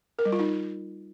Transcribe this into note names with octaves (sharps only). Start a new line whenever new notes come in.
A#4
G3
F4
D#4